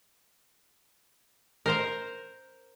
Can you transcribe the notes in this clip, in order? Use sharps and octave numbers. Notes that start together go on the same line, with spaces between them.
A#4 C5 A#5